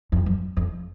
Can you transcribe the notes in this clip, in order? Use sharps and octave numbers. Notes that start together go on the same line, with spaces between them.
F2
F#2
F2